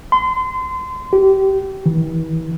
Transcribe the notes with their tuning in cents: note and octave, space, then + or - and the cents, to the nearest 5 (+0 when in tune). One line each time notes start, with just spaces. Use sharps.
C6 -30
G4 -25
E3 -35